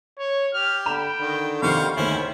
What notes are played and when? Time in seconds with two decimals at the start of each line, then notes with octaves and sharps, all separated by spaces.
0.19 C#5
0.53 G4 F6
0.86 D3 G5 B5 E7
1.20 D3 D#3
1.62 F2 C3 D#3 C5 F5 C#6
1.97 D2 G#2 D#3 A3 C#4 E4 C5